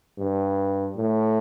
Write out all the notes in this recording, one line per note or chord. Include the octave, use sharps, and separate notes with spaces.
G2
A2